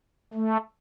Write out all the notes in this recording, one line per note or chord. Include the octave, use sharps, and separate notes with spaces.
A3